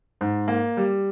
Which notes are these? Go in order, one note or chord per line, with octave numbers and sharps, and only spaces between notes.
G#2
A#3
G3